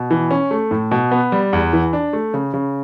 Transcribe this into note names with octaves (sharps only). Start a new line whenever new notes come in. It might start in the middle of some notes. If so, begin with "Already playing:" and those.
Already playing: B2
E3
C#4
A3
A2
B2
B3
G3
E2
E3
D4
A3
C#3
C#3